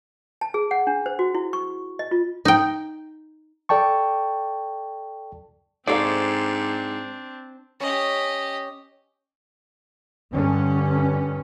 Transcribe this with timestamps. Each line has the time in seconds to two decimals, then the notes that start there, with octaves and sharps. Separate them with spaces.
0.41 A5
0.54 G#4
0.71 F#5
0.87 D4
1.06 C5
1.19 F#4
1.35 E4
1.53 C#6
1.99 D#5
2.11 F4
2.45 D#4 G5
3.69 A4 D5 G5 A5 C#6
5.87 G#2 C4 D4 D#4 A4 C5 D5 F5
7.80 C#4 G4 D#5
10.33 G2 D3 C#4